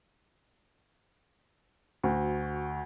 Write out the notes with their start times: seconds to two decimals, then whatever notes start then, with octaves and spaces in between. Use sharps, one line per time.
2.03 D2 F#4